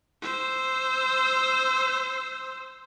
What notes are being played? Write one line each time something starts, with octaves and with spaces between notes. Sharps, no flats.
C5 E6